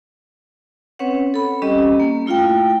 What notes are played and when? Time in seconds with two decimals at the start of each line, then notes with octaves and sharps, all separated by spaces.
0.99 C4 C#4 B4 C#5 F#5
1.34 A4 B5
1.62 G3 C4 C#4 G4 D#5
2.00 A#3
2.26 A3 E4 F4 F5 G5